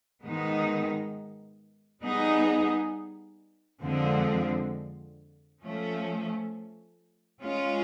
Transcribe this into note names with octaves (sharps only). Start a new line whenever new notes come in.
G#2 D#3 G#3 B3 D#4
G3 B3 D#4 G#4
F2 D3 F3 G#3 C4
F3 A3 C#4
G#3 C#4 F4